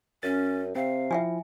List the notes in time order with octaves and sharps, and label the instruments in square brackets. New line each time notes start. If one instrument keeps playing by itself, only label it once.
[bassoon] F#2 [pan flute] C#4 [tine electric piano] A6
[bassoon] C3 [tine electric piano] C4 [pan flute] F5
[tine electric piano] F3 E4 [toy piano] E5 G5 G#5